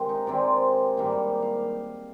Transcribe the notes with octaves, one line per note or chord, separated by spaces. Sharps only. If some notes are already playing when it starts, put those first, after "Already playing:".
Already playing: C3 D#3 G#3 C4
D#4
C3 D#3 G#3 C4 D5
G#2 D#3 G3 A#3
F5